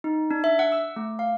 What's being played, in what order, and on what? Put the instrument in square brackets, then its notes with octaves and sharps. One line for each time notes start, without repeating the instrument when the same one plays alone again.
[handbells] D#4
D4
E5
F#5
E6
A3
F5